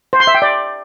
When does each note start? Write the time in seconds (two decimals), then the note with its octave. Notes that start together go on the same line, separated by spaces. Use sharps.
0.13 C5
0.20 C6
0.27 E5
0.35 G5
0.42 D5